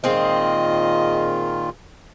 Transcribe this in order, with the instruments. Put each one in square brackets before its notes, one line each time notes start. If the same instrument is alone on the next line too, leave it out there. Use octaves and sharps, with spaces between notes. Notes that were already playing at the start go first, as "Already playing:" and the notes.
[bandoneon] A#2 D#3 F4 [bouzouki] G#3 C4 [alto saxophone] D#5